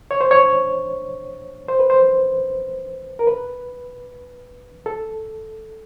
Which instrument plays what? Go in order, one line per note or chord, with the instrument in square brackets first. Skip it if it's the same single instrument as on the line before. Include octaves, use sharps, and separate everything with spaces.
[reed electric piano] C#5
C5
C#5
C5
B4
C5
A#4
B4
A4